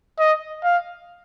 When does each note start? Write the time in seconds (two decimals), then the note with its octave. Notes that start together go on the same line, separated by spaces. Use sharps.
0.20 D#5
0.64 F5